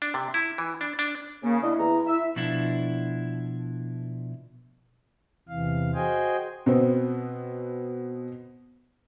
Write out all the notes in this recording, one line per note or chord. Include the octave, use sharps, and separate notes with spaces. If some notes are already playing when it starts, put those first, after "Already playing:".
D4
C3
E4
E3
D4
D4
C#3 A#3
D4 E4 D#5
E2 A#5
E5
B2 F3 D4 E4
E2 C3 E3 F5
F#4 G#4 C5 D#5 G5 G#5
B2 B3 C4